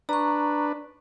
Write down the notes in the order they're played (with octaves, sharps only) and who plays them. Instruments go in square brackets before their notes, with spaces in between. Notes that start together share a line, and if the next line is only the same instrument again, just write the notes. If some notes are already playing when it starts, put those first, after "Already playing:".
[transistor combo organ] D4 B4 [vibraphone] A#5 C#6